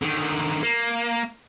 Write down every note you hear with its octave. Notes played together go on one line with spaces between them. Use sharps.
D3 D#3
A#3